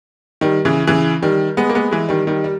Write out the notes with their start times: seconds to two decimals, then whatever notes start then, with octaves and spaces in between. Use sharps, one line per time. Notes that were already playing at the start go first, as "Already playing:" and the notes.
0.41 D#3 G3
0.65 C#3 E3
0.87 C#3 E3
1.22 D#3 G3
1.57 G#3 B3
1.69 A#3
1.75 G#3 B3
1.91 E3 G#3
2.09 D#3 G3
2.27 D#3 G3
2.44 G3